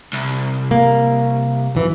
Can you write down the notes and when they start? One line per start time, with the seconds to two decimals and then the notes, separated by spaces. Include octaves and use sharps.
0.13 C2
0.71 A#3
1.75 F#2 E3